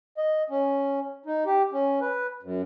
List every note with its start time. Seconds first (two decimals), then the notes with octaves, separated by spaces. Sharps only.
0.17 D#5
0.50 C#4
1.26 D#4
1.46 G4
1.72 C#4
2.01 B4
2.43 F#2